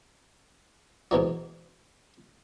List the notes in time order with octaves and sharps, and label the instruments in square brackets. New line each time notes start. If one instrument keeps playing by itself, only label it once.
[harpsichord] G#2 B2 E3 F#3